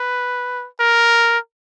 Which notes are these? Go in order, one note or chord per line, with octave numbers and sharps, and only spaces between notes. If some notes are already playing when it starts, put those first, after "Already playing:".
Already playing: B4
A#4